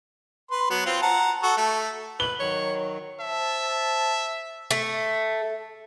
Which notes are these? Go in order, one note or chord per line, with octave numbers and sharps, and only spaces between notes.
B4 C6
F#3 B3
C4 F4
F#5 A5 A#5
F#4 A4
A3
B4 F#7 G7
D#3 F#3 C#5
C5 E5 A5
A3